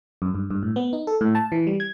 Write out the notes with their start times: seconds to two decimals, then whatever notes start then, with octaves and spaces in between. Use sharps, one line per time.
0.22 F#2
0.35 G2
0.50 G2
0.63 A2
0.76 B3
0.93 D#4
1.07 A4
1.21 A2
1.35 A5
1.52 E3
1.67 G3
1.80 G#6